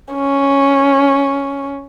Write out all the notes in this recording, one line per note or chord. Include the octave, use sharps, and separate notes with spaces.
C#4